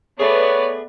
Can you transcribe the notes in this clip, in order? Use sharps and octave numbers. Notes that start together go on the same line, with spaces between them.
A3 B3 G#4 B4 C#5 D5